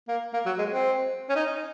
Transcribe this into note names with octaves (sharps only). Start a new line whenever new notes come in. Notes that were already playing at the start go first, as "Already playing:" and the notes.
A#3
A#3
F#3
G#3
C4
C#4
D#4